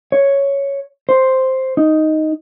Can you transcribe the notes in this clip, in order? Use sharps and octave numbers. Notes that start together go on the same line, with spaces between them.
C#5
C5
D#4